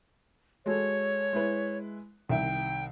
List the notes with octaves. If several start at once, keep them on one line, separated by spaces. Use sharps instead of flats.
G#3 F#4 A4 C#5
G#3 E4 B4
C2 D#3 E5 G5